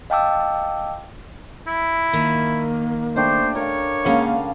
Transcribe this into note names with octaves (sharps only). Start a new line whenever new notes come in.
D#5 F5 G5 A5 D6 E6
E4
D#3 A#3
A3 D4 G4 C5
A#4 C#5 F5
C#3 G#3 A#3 C#4 A4 F5 F#5